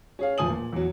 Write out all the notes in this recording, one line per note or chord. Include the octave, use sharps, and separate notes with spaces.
C#4 G#4 F5
E1 F3 G#5 D#6 F#7
A#2
E2 F#3